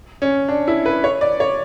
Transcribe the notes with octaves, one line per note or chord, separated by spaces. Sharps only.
C#4
D4
E4
B4
C#5
D5
C#5